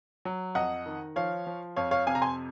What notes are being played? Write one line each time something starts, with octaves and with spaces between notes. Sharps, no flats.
F#3
F2 D#5 F#5
D#3
F3 C#5 F5
F3
F2 C#5 F5
C#5 F5
C3 F5 G#5
A#5
G#5 C6